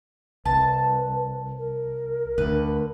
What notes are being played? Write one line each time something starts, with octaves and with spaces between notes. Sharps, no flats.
C2 B4 A5
A#4
D2 D3 B4